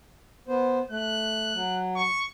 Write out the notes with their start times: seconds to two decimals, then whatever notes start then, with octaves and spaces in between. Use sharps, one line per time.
0.48 B3 C5
0.90 A3 F#6
1.54 F#3
1.96 C#6